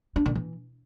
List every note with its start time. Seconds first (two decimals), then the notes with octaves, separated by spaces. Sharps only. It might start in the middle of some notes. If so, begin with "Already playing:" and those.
0.16 D4
0.26 D3
0.35 E3